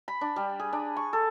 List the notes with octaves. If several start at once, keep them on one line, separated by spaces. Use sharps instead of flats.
B5
D4
G3
G#4
D4
C#6
A4